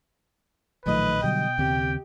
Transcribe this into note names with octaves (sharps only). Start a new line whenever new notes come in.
A#1 A2 D#3 F3 F#3 A3 B4 D#5
B2 D3 F#3 G3 G5
D#2 C#3 C4 G4